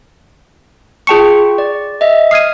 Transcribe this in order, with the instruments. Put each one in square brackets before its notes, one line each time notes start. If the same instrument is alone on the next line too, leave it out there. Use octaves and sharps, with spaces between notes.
[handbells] F4 G5 C#6 [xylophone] G#4 A5 C#7
[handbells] D5
D#5 E5
[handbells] D#6 F6 G#6 [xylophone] C7 D#7